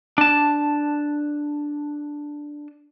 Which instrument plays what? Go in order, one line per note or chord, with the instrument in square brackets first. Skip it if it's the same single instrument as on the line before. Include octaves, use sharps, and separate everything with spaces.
[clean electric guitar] D4 A5